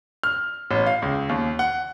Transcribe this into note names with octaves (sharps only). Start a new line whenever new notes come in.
F6
A1
F5
C#2
D#2
F#5